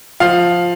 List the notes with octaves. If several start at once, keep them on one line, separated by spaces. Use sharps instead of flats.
F3 F5